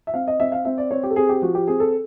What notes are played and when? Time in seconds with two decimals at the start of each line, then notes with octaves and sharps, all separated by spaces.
0.07 E5
0.14 C4 F5
0.28 D#5
0.40 C4 E5
0.52 F5
0.65 C4 E5
0.78 D5
0.91 C4 C#5
1.03 G4
1.10 A4
1.16 C4 G#4
1.29 G4
1.42 F3 F#4
1.55 G4
1.67 C4 G#4
1.80 A4